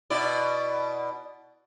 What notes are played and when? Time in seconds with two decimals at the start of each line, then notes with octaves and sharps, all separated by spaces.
0.10 B2 E4 D5